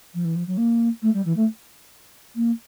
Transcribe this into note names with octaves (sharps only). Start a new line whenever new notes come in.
F3
E3
F3
F#3
A#3
A3
G3
E3
A3
A#3